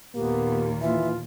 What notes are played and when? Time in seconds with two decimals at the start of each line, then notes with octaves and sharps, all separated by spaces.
0.15 D#2 A#2 A#3 B3 G4
0.81 E3 F4 E5